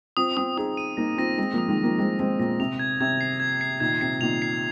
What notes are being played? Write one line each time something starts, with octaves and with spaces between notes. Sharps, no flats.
C4 F4 D#6
C4 F4 D#6
D#4 G#4 D#6
D#7
A#3 D#4 A#6
C4 F4 A#6
G#3 C4 D#7
F3 A#3 D#6
D#3 G#3
D#6
F3 A#3
G#3 C4 D#6
G#3 C4 A#6
A#2 A#6
C3 F7
G#6
C3 G#6
C7
G#6
C7
A#2 D#3 G#6
C3 C7
A#2 D#3 F7
C7